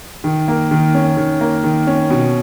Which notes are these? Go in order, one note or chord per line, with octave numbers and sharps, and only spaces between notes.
D#3
A#3
D#3
C#4
D#3
A#3
D#3
C#4
B2